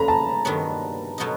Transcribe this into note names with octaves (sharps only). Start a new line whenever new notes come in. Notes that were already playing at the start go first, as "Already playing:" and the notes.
Already playing: C#3 F3 A3 D4 F#4 A#5 B5
A5
G2 D#3 F#3 B3
B2 F#3 B3 D#4